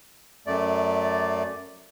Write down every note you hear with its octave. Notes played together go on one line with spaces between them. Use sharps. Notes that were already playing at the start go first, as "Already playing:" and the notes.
F#2 A3 D5